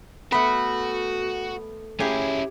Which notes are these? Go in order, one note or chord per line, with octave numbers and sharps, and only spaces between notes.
A3 B3 F#4 B5
C#4 E4 G4 G#4